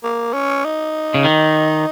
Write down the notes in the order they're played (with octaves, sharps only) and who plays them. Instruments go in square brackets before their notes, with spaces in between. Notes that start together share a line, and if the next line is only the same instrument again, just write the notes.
[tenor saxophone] A#3
C#4
D#4
[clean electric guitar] C#3
D#3